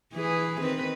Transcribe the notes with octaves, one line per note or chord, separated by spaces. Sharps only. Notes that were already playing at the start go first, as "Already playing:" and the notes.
E3 G#4 B4
D#3 C4 B4